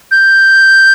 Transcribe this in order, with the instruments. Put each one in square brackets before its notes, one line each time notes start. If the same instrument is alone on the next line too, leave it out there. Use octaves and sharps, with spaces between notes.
[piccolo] G6